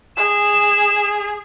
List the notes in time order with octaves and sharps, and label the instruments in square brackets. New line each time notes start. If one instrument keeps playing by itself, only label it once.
[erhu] G#4 [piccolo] E7